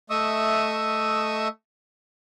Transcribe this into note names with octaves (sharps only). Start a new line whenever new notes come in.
A3 D#5 E5 C#6 D#6 E6